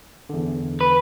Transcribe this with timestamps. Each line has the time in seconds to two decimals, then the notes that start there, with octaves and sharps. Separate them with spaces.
0.29 E2 D3
0.81 B4